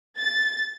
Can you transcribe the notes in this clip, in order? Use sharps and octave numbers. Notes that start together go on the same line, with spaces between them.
A6